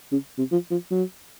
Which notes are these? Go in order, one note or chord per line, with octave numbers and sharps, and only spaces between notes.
C#3
C3
F3
F3
F#3